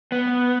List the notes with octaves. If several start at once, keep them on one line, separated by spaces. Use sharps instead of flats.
B3